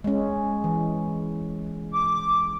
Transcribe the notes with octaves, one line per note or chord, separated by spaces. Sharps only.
G#3 C#4
E3
D6